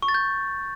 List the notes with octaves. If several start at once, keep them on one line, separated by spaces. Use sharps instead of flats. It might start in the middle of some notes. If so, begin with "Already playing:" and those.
C#6
A6
G6